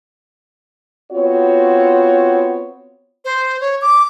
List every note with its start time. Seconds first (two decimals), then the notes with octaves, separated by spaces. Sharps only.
1.11 B3 C4 F4 F#4 C#5
3.25 C5
3.61 C#5
3.81 D6